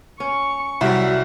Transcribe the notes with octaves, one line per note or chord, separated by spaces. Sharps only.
C#4 C#6
C2 F#3 G3 F#4 E5